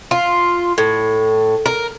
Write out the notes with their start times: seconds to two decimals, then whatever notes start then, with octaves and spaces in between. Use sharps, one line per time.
0.11 F4
0.78 A2
1.66 A#4